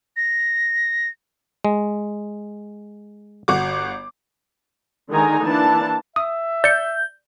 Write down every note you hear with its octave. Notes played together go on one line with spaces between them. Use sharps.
A#6
G#3
G1 F#4 D6
D3 D#3 G#3 D#4 G#5 A#5
E3 A#3 D4 A5
E5 D#6
D5 G6 C#7